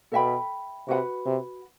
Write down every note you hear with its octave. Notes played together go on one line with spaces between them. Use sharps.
B2 A4 E5 G5 B5
C3 F#4 B4 F#5 B5
C3